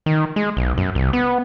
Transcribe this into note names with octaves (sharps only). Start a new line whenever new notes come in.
D#3
G#3
B1
F#2
C2
B3